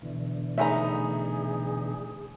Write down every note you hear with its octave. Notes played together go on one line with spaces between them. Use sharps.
B2 D3 E3
A3 D#4 G#4 E5 G#5 A#5 B5